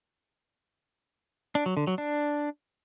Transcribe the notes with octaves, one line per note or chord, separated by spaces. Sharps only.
D4
F#3
D3
F#3
D4